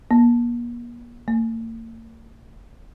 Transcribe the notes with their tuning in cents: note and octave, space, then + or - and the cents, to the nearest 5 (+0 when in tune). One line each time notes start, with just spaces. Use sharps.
A#3 +40
A#3 -45